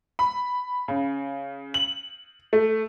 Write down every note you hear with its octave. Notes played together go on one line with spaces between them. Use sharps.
B5
C#3
F#7
A3